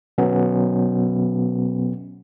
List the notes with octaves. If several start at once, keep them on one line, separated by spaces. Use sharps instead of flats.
B2 F#3 B3 C#4